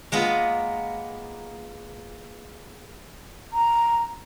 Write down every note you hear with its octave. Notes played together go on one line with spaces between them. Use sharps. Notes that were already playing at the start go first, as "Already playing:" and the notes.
G#3 A#3 B3 F4
A#5